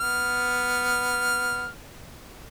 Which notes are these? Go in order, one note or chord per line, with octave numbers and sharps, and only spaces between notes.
B3 F6